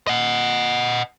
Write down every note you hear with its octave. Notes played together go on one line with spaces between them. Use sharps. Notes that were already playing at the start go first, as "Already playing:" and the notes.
D#5 F#5